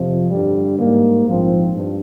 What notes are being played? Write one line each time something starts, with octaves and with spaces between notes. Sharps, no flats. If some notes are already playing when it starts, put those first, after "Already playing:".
Already playing: F2 C3 F3
G2 D3 G3
G#2 G3 A#3
A#1 G#2 F3 C4
G2